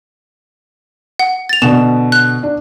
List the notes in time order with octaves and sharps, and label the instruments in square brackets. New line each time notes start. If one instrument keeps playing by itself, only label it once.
[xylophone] F#5
A6 F7
[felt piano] B2 D3 [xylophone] E7
[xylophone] F#6
[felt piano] D4